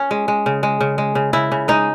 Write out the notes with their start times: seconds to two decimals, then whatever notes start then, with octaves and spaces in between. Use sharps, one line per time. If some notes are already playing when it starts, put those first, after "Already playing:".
Already playing: C#4
0.11 G#3
0.28 G#3
0.46 C#3
0.63 G#3
0.80 C#3
0.98 G#3
1.15 C#3
1.33 C#3 E4
1.52 C#3
1.68 G#3 D#4